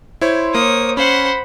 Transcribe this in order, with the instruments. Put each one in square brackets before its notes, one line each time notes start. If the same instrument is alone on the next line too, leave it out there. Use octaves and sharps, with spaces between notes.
[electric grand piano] E4 C#5 [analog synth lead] C5
[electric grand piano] A#3 [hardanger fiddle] C#5 D#6
[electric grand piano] C#4 [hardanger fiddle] C5 F#5 [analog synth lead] B5